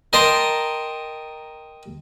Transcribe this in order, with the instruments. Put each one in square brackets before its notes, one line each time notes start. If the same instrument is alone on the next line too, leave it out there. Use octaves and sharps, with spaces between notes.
[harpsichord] A#4 D#5 G5 A5 A#5 C6